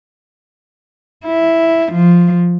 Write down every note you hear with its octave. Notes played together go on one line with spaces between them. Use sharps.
E4
F3